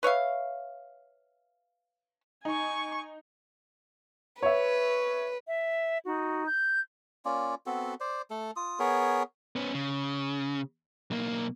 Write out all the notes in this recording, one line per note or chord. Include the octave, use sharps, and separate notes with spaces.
B4 C#5 E5 F5
D#4 G#5 C#6
B4 C#5 E5
E5
D#4 F#4
G6
A#3 C#4 F4 D5
B3 C4 F#4 A4
C5 D5
A3 A4
F4 D#6
B3 G#4 A#4 C#5
B3 C#4
C#3
B1 A#3